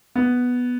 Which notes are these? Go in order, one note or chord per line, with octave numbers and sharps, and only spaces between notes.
B3